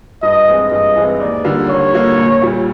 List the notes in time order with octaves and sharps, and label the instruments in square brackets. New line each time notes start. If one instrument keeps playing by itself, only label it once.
[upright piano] G2 [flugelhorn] D#5
[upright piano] E3 G#3 C4
[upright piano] G2 [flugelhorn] D#5
[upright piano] E3 G#3 C4
[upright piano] D#2 [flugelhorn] D5
[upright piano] D3 G3 A#3
[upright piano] D#2 [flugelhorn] C#5
[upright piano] D3 G3 A#3
A#1
A#2 G3